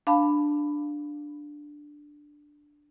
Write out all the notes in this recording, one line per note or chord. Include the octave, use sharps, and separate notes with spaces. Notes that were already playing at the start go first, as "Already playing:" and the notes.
D4 F5 A5 B5